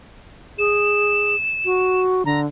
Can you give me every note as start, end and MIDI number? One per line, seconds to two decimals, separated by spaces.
0.58 1.36 68
0.58 2.01 100
1.65 2.25 66
2.25 2.46 50
2.25 2.40 82